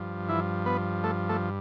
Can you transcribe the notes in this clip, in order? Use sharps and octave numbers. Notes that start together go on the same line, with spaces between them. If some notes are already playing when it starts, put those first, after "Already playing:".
Already playing: G2 F3
E3 E4
B3 B4
A3 A4
A3 A4